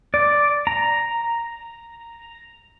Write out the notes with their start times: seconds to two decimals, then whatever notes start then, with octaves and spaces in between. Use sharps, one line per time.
0.14 D5
0.67 A#5